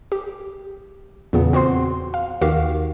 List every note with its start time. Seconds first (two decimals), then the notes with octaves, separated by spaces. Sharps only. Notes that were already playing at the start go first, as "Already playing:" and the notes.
0.12 G4
1.33 E2 A#2 C#3 B3
1.53 C4 F#4 C5 C6
2.14 F5
2.41 D#2 D#3 F#4 G4 F5